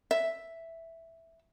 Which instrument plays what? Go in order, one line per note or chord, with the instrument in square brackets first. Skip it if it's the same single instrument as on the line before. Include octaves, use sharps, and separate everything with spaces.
[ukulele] E5